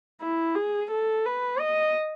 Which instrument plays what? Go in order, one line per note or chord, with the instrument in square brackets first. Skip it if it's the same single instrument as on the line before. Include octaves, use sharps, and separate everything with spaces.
[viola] E4
G#4
A4
B4
D#5